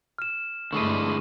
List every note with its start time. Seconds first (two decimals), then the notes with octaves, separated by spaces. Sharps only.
0.18 F6 E7
0.73 G2 D3 G#3 A3 E4 C#6 D#7